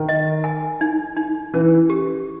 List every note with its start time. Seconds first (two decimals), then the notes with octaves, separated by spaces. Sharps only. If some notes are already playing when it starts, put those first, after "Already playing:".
Already playing: D#3
0.09 D#5
0.44 G#5
0.81 D#4
1.17 D#4
1.54 E3 C#4
1.90 G4